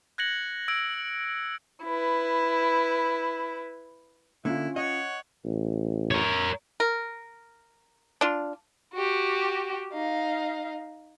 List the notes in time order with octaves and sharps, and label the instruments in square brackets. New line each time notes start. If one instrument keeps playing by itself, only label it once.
[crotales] F#6 G#6 A#6 C#7 F#7
E6 G#6 D7
[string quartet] E4 B4
[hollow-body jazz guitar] D3 A#3 [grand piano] C#4 F4 [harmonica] E4
[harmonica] C#5 F#5 [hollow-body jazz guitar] D#5
[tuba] A1
[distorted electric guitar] A#4 C#5
[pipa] A#4
D4 F4
[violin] F#4 G4
D#4 F5